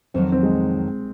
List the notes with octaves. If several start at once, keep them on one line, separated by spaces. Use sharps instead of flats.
F2 D#3 F#3 C4
C4
G#3